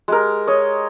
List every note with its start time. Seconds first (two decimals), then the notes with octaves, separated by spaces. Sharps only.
0.08 G#3 G4 A#4
0.47 C#5 D#5